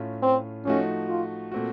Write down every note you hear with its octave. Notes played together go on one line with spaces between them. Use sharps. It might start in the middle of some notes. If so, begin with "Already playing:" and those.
Already playing: A2 A3 C#4 F4
C4
F3 A3 C#4 D#4 F#4
F4
A#2 A3 C4 F#4